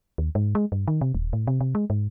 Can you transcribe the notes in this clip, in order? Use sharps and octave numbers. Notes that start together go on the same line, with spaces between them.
D#2
G#2
G#3
G2
D#3
C3
D#1
A2
C3
C3
G#3
G#2